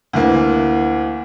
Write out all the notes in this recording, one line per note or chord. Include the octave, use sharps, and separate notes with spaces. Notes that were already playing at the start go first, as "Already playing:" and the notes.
D2 E3 A#3